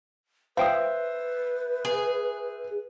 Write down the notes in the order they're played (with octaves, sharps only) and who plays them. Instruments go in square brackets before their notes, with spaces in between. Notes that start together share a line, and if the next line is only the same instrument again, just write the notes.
[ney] B4 [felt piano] C5 E5 [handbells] F5 G5 D#6
[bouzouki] G#4